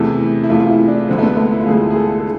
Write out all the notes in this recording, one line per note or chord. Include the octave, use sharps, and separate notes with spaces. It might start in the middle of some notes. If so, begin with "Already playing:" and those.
Already playing: E2 C3 E3 A3
E4
E2 C3 E3 A3 F4
F4
E4
D4
D2 D3 G#3 C4
A3
B3
A3
E4
F4
D2 D3 G#3 G#4
G#4
A4
A4